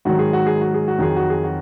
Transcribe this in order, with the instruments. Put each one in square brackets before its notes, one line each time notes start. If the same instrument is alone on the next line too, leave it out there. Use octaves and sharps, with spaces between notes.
[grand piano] G#2 D#3 F#3 F#4
G#4
F#4
G#4
F#4
G#4
F#4
F2 D#3 F#3 G#4
F#4
G#4
F#4